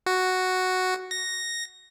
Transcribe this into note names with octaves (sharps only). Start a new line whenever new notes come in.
F#4
A#6